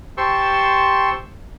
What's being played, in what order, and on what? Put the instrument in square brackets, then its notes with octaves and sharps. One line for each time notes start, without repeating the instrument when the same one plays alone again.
[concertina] G4 C5 A5 C6 C#6 E6